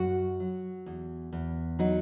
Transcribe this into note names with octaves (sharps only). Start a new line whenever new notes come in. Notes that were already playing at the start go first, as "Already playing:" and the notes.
Already playing: F#2 F#4
F#3
E2
E2
F#3 D#4